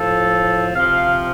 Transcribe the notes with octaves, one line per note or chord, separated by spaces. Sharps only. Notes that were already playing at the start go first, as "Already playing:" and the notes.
Already playing: A2 F3 A4
C3 F3 F5